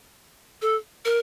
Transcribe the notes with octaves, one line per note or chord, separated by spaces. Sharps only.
A4
A#4